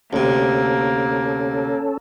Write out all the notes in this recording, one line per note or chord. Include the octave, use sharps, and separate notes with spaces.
D2 C3 A#3 C#4 A4